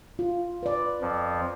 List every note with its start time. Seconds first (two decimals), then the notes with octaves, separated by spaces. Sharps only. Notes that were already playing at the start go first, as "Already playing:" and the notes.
0.19 F4
0.63 B4 D5
1.01 F2 F3